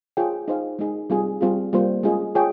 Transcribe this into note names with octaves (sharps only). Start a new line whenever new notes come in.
F4 G#4 C#5 G5
D#4 G#4 C5 F5
G#3 D#4 G#4
G3 C4 F4 G#4
G3 C4 F4 G#4
G3 A#3 F4 C5
G#3 C#4 F4 G#4 D#5
F4 G#4 C#5 G5